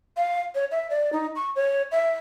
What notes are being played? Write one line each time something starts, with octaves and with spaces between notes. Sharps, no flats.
F5
C#5
E5
D5
D#4
C#6
C#5
E5